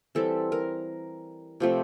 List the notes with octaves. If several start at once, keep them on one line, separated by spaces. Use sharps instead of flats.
E3 G3 C4 A4
A#4
C3 F3 A3 C4